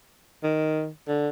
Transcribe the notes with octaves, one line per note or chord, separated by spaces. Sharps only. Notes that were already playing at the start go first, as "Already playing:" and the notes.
D#3
D3